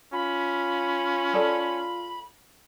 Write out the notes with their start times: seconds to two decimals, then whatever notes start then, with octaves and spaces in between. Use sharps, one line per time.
0.13 C#4 F4 B5
1.33 G#4 A4 D5